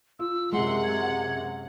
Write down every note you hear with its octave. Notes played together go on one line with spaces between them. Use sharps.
F4 E6
F#2 C3 G#3 F#5 C6
G#6